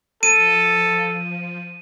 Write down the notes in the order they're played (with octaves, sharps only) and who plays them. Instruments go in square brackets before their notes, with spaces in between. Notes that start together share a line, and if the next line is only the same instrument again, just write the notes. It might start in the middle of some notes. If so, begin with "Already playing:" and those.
[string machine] F3 [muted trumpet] A4 [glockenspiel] D#7